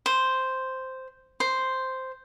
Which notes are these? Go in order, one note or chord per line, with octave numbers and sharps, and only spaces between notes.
C5
C5